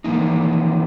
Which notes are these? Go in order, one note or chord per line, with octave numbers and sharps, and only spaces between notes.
E3 F3 A#3 D#4